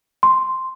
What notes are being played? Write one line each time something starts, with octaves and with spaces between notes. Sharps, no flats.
C6